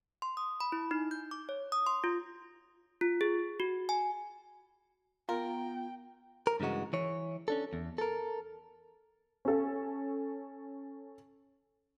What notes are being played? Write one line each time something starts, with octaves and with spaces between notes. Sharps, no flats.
C6
D#6
B5
E4
D#4
G6
D6
C#5
D#6
C6
F4
F4
G#4
F#4
G#5
B3 F4 A#4 G5
A#4
G2 C#3 E3 G#3 F#4
E3 C#5
C#4 D4 A4
E2
A4 A#4
C#4 A4